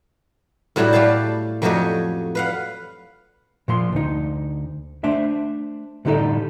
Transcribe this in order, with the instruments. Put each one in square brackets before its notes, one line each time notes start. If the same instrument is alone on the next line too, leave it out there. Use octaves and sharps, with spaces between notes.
[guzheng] A2 F#3 G3 E4 F#4 G4
A3 G4 D5 F5 A5
F2 F#3 A3 G4 C#5 D#5
B4 F5 F#5
[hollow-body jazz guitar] A#2 F3 C6
D2 D#4
A3 D4 C5 E5
A2 D3 G3 D#4 A4 D#5